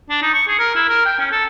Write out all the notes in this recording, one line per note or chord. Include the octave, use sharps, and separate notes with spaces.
D4
D#4
C#6
G#4
A#4
E4
A#4
G5
C#4
A4